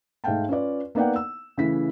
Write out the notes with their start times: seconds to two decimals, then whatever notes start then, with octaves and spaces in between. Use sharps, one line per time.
0.24 G#2 A3 F5 G5 A5
0.49 C#4 F4 B4 D5
0.95 A#3 B3 D#4 D5 F#5 G5
1.16 E6
1.58 C#3 E3 A3 B6